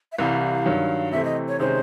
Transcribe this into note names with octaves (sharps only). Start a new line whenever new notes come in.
E5
C2 C3 E3 G3 F5
G2 D#3 F#3
C3 E3 A3 C4 E5
D#5
C#5
C3 D#3 G#3 C#4 C5